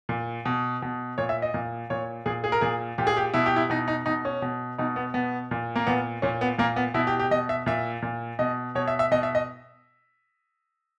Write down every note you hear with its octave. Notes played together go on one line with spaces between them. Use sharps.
A#2
B2
B2
A#2 C#5
E5
D#5
A#2
A#2 C#5
A#2 G#4
G#4
A#4
A#2 G#4
A#2 G4
G#4
G4
B2 E4
G4
E4
B2 D#4
D#4
B2 D#4
C#4
B2
B2 D#4
B3
B2 B3
A#2
A#3
A#2 B3
A#2 C#4
B3
A#2 A#3
B3
B2 E4
G4
G4
B2 D#5
E5
A#2 E5
A#2
B2 D#5
B2 C#5
E5
E5
B2 D#5
E5
D#5